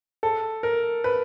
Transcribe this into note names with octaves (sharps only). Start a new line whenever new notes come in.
A4
A#4
B4